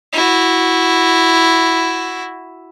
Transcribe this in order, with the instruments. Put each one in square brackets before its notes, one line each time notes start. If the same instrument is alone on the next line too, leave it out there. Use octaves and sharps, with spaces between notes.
[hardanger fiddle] E4 F#4